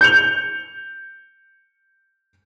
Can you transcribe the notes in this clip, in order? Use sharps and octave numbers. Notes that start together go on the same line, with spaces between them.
G6 C#7 F7